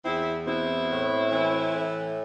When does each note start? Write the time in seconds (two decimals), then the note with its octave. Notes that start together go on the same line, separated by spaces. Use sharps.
0.05 E2 C4 E4
0.47 B2 C4 E4
0.89 A2
1.32 E3
1.75 A2